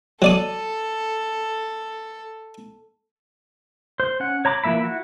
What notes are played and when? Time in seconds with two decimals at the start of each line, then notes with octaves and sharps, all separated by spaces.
0.22 F#3 A4 D5 D#6
4.00 C5
4.20 C#4 F#5
4.45 C#5 A#5 B5 D6
4.64 E3 F3 A#3 E5 B5
4.83 E4 F#4